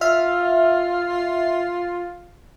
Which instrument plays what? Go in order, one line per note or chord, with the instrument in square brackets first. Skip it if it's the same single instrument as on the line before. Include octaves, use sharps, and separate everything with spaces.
[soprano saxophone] F4 [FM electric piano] E5 F6